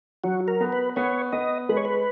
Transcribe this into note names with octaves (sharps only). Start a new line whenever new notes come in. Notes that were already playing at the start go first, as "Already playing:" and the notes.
F#3 F#4
A#4
B3
B4
B3 C#5
B3 D#5
G#3 B4
C#5
B4